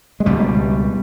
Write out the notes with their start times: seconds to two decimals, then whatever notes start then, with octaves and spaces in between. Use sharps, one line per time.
0.20 G#3
0.26 C#2 B2 G3